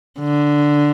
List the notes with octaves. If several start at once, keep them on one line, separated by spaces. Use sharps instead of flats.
D3